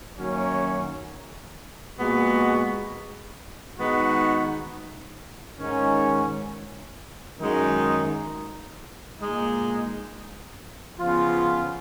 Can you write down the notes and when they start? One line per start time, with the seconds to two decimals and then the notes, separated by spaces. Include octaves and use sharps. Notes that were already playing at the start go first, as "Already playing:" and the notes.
0.18 F#2 D#3 F#3 A#3 C#4
1.98 A#2 G#3 B3 F#4
3.78 D#3 G#3 B3 D#4 F#4
5.58 G#2 D#3 G#3 C#4
7.39 F#2 D#3 G#3 D#4
9.19 A#2 G#3 D#4
10.98 C#3 F3 B3 F4